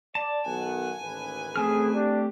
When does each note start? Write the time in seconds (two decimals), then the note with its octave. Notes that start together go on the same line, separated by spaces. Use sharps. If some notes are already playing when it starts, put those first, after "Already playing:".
0.15 D5 A5
0.46 B1 D#3 F#5 G#5
1.01 A1 D#2 B4
1.56 A3 C4 G#4 F6
1.94 D4 G4